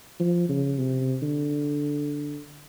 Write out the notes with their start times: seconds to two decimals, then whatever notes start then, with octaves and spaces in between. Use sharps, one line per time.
0.20 F3
0.49 C#3
0.78 C3
1.22 D3